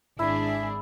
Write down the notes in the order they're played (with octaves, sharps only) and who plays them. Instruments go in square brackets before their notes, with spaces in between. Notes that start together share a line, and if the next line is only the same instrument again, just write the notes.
[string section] G#1 D4 G#4 [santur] E4 [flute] E5